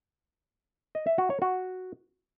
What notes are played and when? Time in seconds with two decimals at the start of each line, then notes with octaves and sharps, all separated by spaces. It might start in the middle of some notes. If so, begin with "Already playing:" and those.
0.95 D#5
1.07 E5
1.18 F#4
1.30 C#5
1.42 F#4